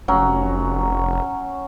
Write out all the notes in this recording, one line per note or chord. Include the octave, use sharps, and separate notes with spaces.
F1 F#3 C#4